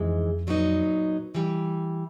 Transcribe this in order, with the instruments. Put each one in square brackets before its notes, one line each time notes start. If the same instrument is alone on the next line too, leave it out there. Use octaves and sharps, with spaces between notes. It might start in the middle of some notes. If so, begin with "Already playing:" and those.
Already playing: [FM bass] F2 [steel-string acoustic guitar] G#2 E3 G#3
[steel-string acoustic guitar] A#2 F#3 B3 D#4
E3 G3